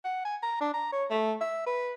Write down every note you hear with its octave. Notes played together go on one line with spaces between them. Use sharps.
F#5
G#5
A#5
D4
A#5
C#5
A3
E5
B4